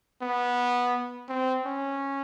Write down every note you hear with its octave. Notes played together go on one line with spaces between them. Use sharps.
B3
C4
C#4